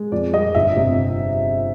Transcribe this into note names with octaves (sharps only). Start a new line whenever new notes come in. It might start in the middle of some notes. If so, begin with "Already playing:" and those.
Already playing: G#3
F2 D5
G3 D#5
G1 E5
C3